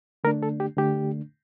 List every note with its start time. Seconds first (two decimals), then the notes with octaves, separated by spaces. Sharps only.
0.24 D3 A3 D4 A#4
0.43 A4
0.60 G4
0.77 D3 A3 D4 G4